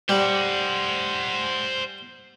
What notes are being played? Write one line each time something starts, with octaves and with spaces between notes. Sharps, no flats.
G3 C5 F#5